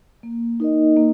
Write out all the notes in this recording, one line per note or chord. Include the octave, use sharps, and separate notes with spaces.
A#3
D#4 A#4 D#5
A#3